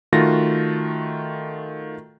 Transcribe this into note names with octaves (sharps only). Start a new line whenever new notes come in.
D#3 A3 F4 F#4 A6 A#6